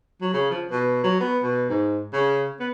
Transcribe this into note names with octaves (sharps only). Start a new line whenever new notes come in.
F#3
C#3
F3
B2
F#3
B3
B2
G#2
C#3
B3